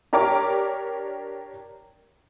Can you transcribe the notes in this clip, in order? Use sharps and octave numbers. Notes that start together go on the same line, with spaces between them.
D4 G4 A#4 C#5 D6